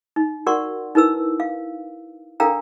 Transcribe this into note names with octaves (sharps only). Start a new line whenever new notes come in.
D#4
F#4 A#4 D5 F#5 C6 C#6
D#4 E4 A#4 B4 E6
F5
D4 A4 A#4 F5 G5 A#5